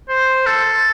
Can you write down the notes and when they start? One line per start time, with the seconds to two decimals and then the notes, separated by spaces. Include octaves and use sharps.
0.09 C5
0.46 A4